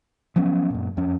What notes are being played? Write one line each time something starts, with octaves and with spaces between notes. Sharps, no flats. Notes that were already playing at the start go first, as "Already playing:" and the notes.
F3 F#3 B3 C#4
F#2 A#2
F2 C#4